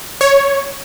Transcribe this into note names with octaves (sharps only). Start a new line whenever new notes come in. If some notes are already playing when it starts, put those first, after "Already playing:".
C#5